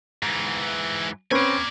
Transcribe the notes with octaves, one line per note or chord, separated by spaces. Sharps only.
G#2 E3
C4 C#4 B4 D5 G#5